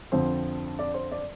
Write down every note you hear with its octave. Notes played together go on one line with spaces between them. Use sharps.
F2 D3 F3 C4 C5
D5
C5
D5